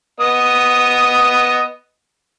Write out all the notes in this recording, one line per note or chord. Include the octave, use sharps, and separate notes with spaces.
B3 D#5 D#6